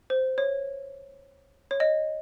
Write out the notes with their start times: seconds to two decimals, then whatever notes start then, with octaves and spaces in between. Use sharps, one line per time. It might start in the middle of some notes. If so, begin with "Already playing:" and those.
0.10 C5
0.38 C#5
1.71 C#5
1.80 D#5